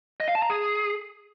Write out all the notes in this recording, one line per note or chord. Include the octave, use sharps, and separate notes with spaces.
D#5
F5
A5
A#5
G#4